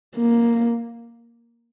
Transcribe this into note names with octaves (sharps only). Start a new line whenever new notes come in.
A#3